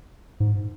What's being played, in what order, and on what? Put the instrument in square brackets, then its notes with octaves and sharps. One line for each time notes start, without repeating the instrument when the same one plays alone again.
[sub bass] G#2